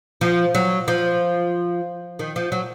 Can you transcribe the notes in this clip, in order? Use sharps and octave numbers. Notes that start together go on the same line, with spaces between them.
F3
F#3
F3
D#3
F3
F#3